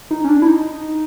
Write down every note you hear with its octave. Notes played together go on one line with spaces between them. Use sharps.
D#4
C#4
D4
E4
D#4